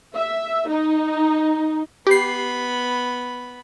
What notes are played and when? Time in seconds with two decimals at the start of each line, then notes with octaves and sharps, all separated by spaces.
0.15 E5
0.68 D#4
2.07 B3 G4 B5 C7